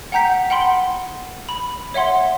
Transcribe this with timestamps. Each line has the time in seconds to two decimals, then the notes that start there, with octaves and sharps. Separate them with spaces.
0.12 F#5 G5 A#5 G6 B6
0.50 F#5 G5 B5 C6
1.49 B5
1.94 C#5 E5 F#5 C6